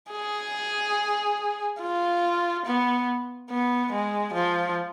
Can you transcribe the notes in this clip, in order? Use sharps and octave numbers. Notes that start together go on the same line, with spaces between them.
G#4
F4
B3
B3
G#3
F3